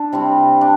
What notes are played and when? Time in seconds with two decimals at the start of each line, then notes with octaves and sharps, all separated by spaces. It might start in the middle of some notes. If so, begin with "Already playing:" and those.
Already playing: D4 A4
0.13 C3 G3 C4 E4
0.61 D4